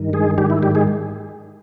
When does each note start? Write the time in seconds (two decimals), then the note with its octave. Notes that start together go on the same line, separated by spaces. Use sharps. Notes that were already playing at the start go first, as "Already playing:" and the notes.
Already playing: G2 D#3
0.13 G#3 G#4
0.38 G#2 D#3 G3 G4
0.50 E4
0.63 G3 G4
0.75 G#3 G#4